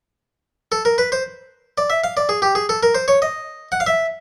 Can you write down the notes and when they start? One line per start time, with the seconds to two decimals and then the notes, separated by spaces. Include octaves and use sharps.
0.72 A4
0.85 A#4
0.98 B4
1.12 C5
1.78 D5
1.90 E5
2.04 F5
2.17 D5
2.29 G#4
2.42 G4
2.55 G#4
2.69 A4
2.83 A#4
2.95 C5
3.08 C#5
3.22 D#5
3.72 F#5
3.80 F5
3.87 E5